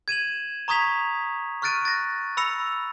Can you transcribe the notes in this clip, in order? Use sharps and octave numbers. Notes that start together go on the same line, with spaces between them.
G#6 D#7 E7 F#7
A#5 C#6 D#6 G#6 B6 F7
C#6 F6 F#6 A6 D7 D#7
A6 A#6
B5 E6 A#6 C#7 F7